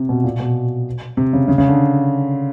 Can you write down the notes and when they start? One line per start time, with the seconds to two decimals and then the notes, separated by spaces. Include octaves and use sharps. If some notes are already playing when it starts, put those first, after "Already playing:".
Already playing: C3
0.09 B2
0.24 A#2
0.40 B2
1.17 C3
1.33 C#3
1.48 C#3
1.58 C#3
1.68 D3